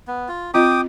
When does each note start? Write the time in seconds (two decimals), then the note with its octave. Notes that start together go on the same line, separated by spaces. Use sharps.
0.08 B3
0.28 F4
0.54 C4 F4 D#5 G5 D6 D#6